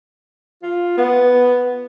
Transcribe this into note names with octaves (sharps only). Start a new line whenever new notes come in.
F4
B3